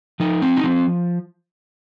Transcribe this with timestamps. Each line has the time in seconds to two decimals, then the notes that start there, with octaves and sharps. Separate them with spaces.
0.20 F3 D#4
0.42 C4
0.57 D#4
0.64 F3 C4